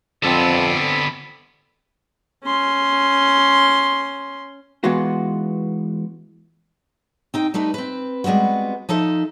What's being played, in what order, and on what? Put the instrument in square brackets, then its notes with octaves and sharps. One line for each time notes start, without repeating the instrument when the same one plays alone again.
[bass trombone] F2 [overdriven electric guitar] D3 B3 [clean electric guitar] C4 A4
[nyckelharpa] C#4 C6
[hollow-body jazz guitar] E3 G#3 B3 F4 F#4
[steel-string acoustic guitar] C4 D#4 G5
G3 A3 D#4 B4
C4 B4
G3 G#3 B3 C4 F#4
F3 D#4 A4 C5 E5